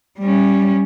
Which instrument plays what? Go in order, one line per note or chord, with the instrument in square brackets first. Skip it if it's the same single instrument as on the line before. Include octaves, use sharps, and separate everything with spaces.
[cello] G3 C#4